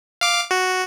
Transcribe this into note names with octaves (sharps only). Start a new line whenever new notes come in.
F5 D6
F#4